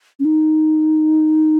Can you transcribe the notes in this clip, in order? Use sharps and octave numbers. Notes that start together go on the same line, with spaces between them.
C#4
D#4